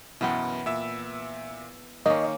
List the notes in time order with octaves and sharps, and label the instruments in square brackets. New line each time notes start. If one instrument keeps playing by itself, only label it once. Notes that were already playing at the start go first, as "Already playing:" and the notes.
[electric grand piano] F#2 B2 [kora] E3 B3 G5
[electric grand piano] A#2 E5 E6
[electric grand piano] D#3 [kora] A#3 C#4 [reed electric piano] D#5